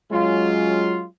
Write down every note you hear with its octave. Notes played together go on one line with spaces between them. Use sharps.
F#3 G#3 C#4 F4